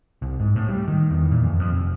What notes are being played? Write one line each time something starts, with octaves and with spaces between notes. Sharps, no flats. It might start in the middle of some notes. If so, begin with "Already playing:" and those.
C2
G#2
A2
G3
D#3
E2
A#2
F2
F2
F1